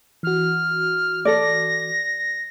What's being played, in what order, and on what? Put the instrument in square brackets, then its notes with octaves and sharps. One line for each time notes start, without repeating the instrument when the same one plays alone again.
[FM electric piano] E3 F#4 [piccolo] F6
[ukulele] A4 D5 [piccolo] A#6